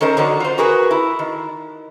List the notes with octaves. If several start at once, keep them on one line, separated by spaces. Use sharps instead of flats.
D#3 A3 C#4 A#4 C5 A#5
D3 D#3 F#3
F4 C5
F#4 G#4 A#4 B4
E4
D#3